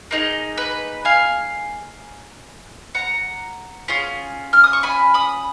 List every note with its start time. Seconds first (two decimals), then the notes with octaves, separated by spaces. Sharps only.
0.11 A#3 D#4 G#4
0.58 B4
1.05 F5 G#5
2.95 F#5 A#5
3.88 C#4 F4 G#4
4.53 F6
4.64 D#6
4.73 C#6
4.83 G#5 B5
5.14 B5 D#6